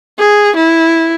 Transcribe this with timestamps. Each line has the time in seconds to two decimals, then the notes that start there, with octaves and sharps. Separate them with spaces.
0.19 G#4
0.56 E4